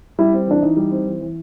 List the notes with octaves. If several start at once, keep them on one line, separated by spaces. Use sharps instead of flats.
G3 E4
C4
E3 D4
E3 D#4
G3
C4
E3
E3